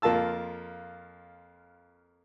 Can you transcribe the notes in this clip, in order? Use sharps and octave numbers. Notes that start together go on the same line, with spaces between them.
F2 A#3 F4 A5 E6